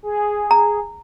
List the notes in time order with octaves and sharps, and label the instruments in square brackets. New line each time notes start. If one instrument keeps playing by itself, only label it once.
[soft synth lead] G#4
[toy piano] A#5